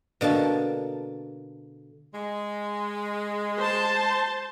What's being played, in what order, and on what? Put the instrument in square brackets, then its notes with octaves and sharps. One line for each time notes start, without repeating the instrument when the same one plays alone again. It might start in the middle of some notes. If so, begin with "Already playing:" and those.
[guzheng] B2 D3 A#3 A5
[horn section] G#3
[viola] C5 A5